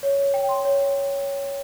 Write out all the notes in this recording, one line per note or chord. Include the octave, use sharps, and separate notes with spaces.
C#5
C#5
G5
C6
C#5